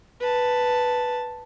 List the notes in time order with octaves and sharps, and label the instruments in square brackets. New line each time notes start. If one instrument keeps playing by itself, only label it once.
[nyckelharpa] B4 A5